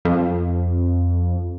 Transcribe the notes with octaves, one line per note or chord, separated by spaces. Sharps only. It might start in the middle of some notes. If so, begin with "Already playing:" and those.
F2